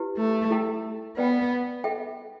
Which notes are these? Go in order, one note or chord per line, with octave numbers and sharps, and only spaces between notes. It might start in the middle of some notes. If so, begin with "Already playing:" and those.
Already playing: E4 G4 B4
A3
E4 A4 G5
B3 B4 D5 G5 B5
A4 E5 G5